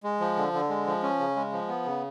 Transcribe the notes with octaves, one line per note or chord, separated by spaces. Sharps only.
G#3
F3
D3
D3
G#3
F3
C#4
C#3
G#3
F3
B3
C#3